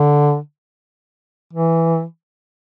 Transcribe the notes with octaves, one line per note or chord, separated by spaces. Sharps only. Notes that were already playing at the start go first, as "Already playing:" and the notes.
Already playing: D3
E3